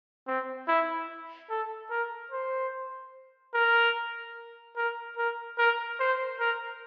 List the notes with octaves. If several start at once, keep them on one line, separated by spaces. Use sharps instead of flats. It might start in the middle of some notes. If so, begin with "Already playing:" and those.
C4
E4
A4
A#4
C5
A#4
A#4
A#4
A#4
C5
A#4